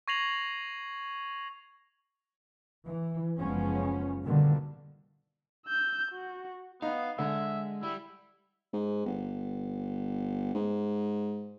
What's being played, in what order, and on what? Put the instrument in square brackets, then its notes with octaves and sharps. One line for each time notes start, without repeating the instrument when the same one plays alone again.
[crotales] C#6 G#6 A#6 C7 F7 F#7
[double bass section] E3
F#1 F3 G#3 B3 C#4
B2 D3 D#3 G3 A#3
[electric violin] E6 G6
F#4
[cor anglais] B3 [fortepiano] D#4 [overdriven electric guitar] F5
[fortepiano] D3 [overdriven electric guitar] G#3 [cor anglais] E5
[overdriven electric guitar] G3 [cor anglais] E4
[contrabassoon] G#2
G1
G#2